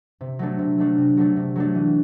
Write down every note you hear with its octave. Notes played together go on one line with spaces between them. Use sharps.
C3
F#3 A3 D4
C3
F#3 A3 D4
C3
F#3 A3 D4
C3
F#3 A3 D4
E3